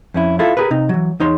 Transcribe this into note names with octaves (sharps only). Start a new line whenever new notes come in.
F2 C#4 E4
E4 F4 A4
G4 G#4 A#4 B4
C3 D#4
E3 F#3
E2 D#4 C#5 C6